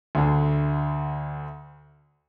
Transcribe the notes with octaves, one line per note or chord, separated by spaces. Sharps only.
D2 D3